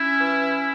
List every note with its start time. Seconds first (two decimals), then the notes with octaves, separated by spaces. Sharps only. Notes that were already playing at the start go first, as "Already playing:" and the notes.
Already playing: C#4 E4
0.20 E3